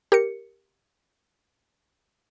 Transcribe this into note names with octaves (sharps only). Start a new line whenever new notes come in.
G4 A#4 C#7